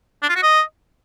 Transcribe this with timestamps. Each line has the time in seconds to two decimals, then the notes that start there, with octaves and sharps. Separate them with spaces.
0.23 D4
0.29 F4
0.36 F#4
0.43 D#5